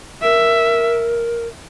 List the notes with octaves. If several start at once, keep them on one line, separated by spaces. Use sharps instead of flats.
A#4 E5